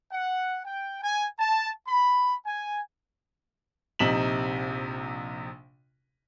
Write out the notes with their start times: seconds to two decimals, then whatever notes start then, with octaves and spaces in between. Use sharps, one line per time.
0.12 F#5
0.65 G5
1.03 G#5
1.38 A5
1.87 B5
2.46 G#5
3.99 A#1 C3 D#4 B6 E7 F#7